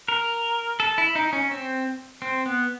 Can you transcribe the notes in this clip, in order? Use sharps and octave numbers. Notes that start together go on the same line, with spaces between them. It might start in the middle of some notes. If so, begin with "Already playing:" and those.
A#4
A4
E4
D#4
C#4
C4
C4
B3